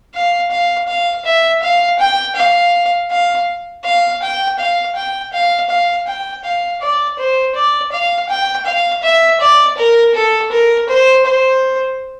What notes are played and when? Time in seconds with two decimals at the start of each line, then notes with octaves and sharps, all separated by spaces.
0.15 F5
0.51 F5
0.88 F5
1.25 E5
1.63 F5
1.99 G5
2.36 F5
3.11 F5
3.85 F5
4.22 G5
4.59 F5
4.96 G5
5.33 F5
5.70 F5
6.07 G5
6.44 F5
6.81 D5
7.19 C5
7.55 D5
7.92 F5
8.29 G5
8.66 F5
9.03 E5
9.41 D5
9.78 A#4
10.15 A4
10.52 A#4
10.89 C5
11.26 C5